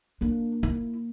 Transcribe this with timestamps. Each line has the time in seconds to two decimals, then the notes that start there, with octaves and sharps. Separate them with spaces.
0.21 A#3 D4
0.63 E4